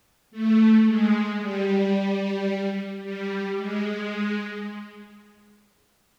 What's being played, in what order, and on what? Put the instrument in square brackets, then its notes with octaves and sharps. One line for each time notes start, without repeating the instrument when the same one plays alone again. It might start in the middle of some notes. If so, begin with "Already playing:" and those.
[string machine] A3
G#3
G3
G3
G#3